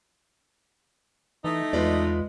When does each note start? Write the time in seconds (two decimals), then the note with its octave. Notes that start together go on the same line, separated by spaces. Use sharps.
1.44 E3 A3 D#4
1.73 E2 G#3 F4 B4 D5